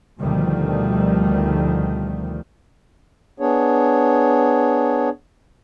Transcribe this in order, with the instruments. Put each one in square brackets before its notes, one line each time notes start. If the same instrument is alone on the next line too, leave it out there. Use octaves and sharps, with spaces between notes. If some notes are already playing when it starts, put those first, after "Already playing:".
[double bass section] D2 B2 D#3 F3 G3 A3
[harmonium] B3 D4 G#4 C#5